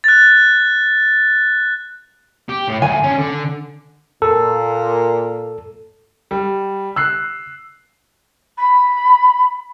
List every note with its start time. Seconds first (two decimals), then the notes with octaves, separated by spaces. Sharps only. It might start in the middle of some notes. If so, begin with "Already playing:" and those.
0.04 F#6 A6
2.49 G4
2.68 A2
2.82 D2 G#5
3.04 C#4 D4
3.18 D3
4.22 A#2 A4
6.31 G3
6.96 E6 F#6 C7
8.57 B5